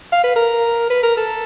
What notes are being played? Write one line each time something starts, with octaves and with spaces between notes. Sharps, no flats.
F5
B4
A#4
B4
A#4
A4